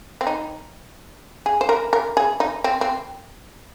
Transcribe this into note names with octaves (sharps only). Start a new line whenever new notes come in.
C4
D#4
G#4
C5
A#4
A#4
G#4
D#4
C4
C4